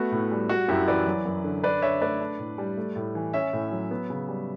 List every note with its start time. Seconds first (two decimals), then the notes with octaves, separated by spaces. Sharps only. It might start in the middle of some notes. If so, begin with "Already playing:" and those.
Already playing: A3 B3 F#4
0.12 A2
0.31 G3
0.49 G3 F#4
0.68 F#2 E4 G4
0.88 E3 B4 D5
1.07 F#3
1.25 F#2
1.44 D3
1.64 D4 B4 D5
1.82 D3 C#5 E5
2.01 A3 B4 D5
2.21 D4
2.39 A2
2.58 G3
2.78 A3
2.96 A2
3.15 E3
3.33 C#4 C#5 E5
3.53 A2
3.72 F#3
3.91 B3
4.10 C#3
4.28 G3